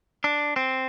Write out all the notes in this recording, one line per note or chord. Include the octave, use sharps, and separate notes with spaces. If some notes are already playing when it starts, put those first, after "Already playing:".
D4
C4